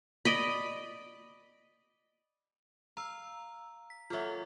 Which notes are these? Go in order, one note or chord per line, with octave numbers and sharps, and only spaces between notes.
D5 D#5 B5
F5 A#5 E6
B6
F#3 A#3 F4 A4 E5